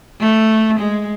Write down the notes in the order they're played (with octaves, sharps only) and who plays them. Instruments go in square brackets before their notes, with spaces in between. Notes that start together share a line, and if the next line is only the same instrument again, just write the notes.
[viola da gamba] A3
G#3